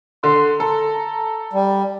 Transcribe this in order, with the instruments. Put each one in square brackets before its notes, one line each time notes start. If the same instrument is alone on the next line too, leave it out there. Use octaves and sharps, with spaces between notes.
[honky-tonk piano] D3 [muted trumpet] C6
[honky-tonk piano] A4 [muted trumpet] A#5
[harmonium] G3